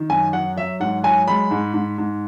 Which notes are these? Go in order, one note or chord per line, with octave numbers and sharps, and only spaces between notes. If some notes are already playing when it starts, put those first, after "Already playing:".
Already playing: D#3
F#2 G#5
F#3 F#5
F#3 E5
G#2 F#5
F#3 G#5
G#3 B5
G#2
G#2
G#2